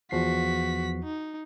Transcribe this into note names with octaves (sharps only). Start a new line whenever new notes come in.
E2 F3 F#4 B6 C7
D#4